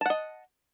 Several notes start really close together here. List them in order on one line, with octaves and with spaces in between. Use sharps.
A5 F#5 D#5